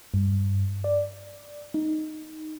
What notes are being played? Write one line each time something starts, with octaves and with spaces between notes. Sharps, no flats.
G2
D5
D#4